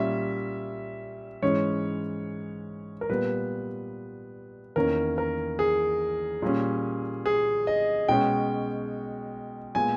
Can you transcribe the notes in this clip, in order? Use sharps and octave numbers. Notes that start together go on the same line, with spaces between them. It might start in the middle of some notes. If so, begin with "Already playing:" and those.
Already playing: A#2 G3 C#4 E5
G#2 E3 G#3 C#4 C#5
A#4
A#2 G3 B3 B4
E2 D#3 A#3 C#4 A#4
A#4
G#4
A#2 G3 C#4
G#4
D#5
B2 G#3 C#4 G5
A#2 G#3 B3 G#5